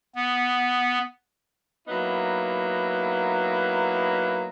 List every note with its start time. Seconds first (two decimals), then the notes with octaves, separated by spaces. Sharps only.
0.15 B3
1.88 F#3 A#3 B3 D#4 E4